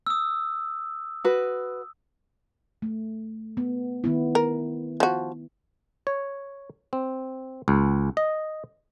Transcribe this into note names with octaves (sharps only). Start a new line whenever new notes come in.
D#6 E6
F#4 B4
A3
B3
D#3 B3 E4
A#4
F3 F#4
C#5
C4
C#2
D#5